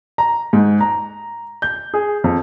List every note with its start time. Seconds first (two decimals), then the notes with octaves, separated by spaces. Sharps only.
0.18 A#5
0.53 G#2
0.81 A#5
1.62 G6
1.94 G#4
2.24 F2